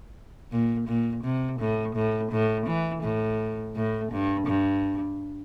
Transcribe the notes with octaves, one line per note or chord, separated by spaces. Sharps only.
A#2
A#2
C3
A2
A2
A2
E3
A2
A2
G2
G2